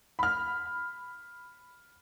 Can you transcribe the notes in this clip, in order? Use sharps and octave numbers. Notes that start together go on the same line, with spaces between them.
B5 F6